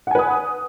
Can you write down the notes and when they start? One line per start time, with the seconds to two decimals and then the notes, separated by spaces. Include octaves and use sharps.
0.07 F#5
0.11 G#5
0.15 B4
0.19 D#6